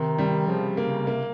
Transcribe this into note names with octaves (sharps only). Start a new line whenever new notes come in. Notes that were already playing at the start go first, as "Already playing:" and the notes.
Already playing: C3 D#3
G3
C#3 F3
A#3
C#3
C3 A#3